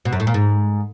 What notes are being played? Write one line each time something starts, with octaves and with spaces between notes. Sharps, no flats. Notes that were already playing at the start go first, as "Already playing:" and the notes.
B2
F#2
A2
A#2
G#2